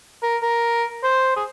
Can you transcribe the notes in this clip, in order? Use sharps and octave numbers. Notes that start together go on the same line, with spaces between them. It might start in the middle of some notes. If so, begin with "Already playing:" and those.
A#4
A#4
C5
G#4